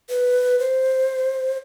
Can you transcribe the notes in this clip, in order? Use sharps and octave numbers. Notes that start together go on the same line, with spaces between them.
B4
C5